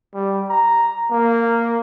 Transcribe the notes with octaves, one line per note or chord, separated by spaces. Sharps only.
G3
A#5
A#3